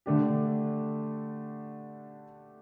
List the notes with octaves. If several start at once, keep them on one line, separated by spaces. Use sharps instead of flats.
D3 A3 D4 G4